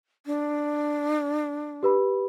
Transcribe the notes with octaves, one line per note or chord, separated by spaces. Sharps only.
D4
G4 B4 B5